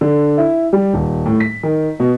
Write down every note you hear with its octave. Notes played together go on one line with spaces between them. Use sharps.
D3
E4
G3
D#1
A2
B6
D#3
B2